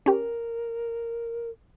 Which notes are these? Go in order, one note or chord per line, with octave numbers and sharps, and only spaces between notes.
C#4 G4 A#4